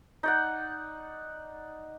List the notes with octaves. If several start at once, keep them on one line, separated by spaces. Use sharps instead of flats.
D#4 D5 F#5